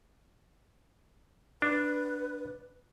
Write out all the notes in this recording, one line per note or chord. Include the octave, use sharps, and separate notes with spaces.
D4 B4